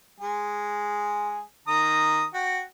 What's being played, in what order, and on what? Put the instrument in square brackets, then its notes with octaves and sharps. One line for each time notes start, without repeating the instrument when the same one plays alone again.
[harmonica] G#3 G#4
D#3 A#5 D#6
F#4 G5